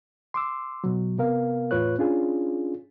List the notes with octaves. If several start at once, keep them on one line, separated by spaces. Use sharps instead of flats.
C6 D6 E6
B2 F#3
C3 B3 A#4 F5
E2 A2 F4 B4 C#5 F#6
C#4 D4 F4 G#4